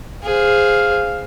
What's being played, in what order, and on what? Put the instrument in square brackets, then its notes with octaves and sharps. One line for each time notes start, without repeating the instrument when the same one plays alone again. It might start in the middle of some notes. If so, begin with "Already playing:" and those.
[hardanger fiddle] G#4 C5 [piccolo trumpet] F5